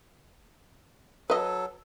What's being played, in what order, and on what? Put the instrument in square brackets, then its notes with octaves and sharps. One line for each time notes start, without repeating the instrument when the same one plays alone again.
[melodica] F#3 A4 [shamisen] B4 D#5